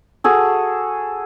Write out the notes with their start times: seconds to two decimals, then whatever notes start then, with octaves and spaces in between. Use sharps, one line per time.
0.24 F#4 G#4 A4